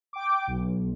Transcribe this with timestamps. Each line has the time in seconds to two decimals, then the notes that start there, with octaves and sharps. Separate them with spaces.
0.13 G5 D6
0.47 B1